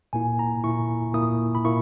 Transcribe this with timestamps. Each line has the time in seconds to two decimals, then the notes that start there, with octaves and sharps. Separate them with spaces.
0.13 A#2 A#3 E4 G#5
0.39 A#5
0.64 A#2 A#3 E4 C#6
1.14 A#2 A#3 E4 D#6
1.55 B5
1.64 A#2 A#3 E4 C#6